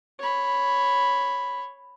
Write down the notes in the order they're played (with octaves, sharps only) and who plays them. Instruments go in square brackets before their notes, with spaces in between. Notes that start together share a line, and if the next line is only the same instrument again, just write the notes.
[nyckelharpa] C#5 B5